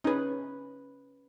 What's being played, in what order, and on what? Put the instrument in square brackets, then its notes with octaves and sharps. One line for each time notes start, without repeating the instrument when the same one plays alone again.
[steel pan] C#4 B4 [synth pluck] D#4 G#4